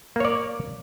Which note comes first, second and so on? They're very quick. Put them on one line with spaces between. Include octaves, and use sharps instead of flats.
A#3 C#5 D5